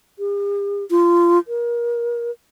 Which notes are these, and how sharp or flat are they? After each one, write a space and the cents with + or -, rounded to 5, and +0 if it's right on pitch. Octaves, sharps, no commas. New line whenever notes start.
G4 +45
F4 -20
A#4 +30